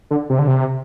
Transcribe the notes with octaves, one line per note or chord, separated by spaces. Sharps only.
D3
C3
D3
C3